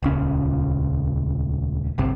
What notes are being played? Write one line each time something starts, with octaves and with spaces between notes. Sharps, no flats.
D#1 C#2 C#4
G1 C2 C3